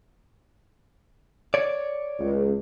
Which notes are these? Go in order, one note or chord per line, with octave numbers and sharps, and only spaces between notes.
C#5 D5
C#2